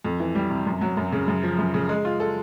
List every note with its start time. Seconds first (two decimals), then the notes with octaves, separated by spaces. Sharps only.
0.05 F2
0.20 E3
0.35 G3
0.50 C3
0.66 F#2
0.81 F#3
0.97 F#2
1.12 C#3
1.28 F#2
1.43 F3
1.58 F#2
1.74 C#3
1.89 G#3
2.05 F4
2.20 A4